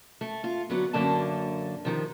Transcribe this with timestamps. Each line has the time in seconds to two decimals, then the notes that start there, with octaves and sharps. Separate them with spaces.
0.21 A3
0.44 F4
0.70 D3 F#3 B3
0.93 F#2 D3 A#3 D4 A5
1.85 C3 D#3 F3